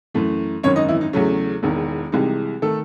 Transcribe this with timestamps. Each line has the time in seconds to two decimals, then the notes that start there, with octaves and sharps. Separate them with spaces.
0.14 F#2 E3 A3
0.63 G#1 F#2 D#3 C#4 C#5
0.76 D#4 D#5
0.88 E3 E4
1.01 D#4
1.13 E2 C#3 F#3 A3 C#4
1.63 E1 E2 D#3
2.12 C2 C3 E3 G#3 D#4
2.62 D#3 A3 A4